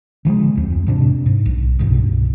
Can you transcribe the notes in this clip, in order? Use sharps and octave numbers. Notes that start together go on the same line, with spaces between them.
D3 F3 G3 G#3
D1 F2
G#2 C3 D4
G#2
B1
C2 G2 B2